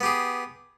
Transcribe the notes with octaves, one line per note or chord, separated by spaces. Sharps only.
B3 G4 G#4